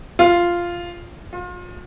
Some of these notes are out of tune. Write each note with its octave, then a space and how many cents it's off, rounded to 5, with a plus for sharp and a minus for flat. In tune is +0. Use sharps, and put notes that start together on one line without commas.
F4 -5
F4 +35